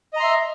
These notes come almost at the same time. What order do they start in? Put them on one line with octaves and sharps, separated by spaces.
D#5 A#5 C6 E5